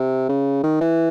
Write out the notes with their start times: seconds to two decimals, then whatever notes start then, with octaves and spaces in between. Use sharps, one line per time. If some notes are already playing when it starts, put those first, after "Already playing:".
Already playing: C3
0.29 C#3
0.63 D#3
0.81 E3